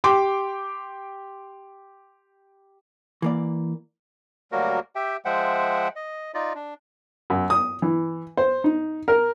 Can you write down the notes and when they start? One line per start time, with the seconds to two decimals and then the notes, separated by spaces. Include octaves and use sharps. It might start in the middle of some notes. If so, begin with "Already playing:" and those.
0.04 G4 G5 C6 D6
3.22 E3 A#3 D5
4.52 D2 F#3 G3 A#3 F#4 A#4
4.96 G4 E5 G5
5.25 F3 G#3 C5 E5 F#5 G5
5.96 D#5
6.34 D#4 F4 D5 D#5
6.55 D4
7.30 F#2
7.50 D#6
7.82 E3
8.37 C5
8.64 D#4
9.08 A#4